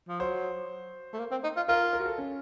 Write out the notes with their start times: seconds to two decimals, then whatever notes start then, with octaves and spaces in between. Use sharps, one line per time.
0.08 F3
0.20 F#3 C5
1.13 A3
1.19 A#3
1.31 C4
1.44 D#4
1.56 F4
1.68 F4 A#4
1.93 A#4
2.00 F#4
2.06 A4
2.18 C#4